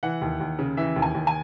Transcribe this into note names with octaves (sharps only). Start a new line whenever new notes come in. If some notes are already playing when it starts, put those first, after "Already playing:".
E3 F#5
D#2
D#2
C#3
E3 E5
D#2
G#5
D#2
G#5